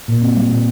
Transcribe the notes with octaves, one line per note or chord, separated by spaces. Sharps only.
A#2
C4
G3
A#2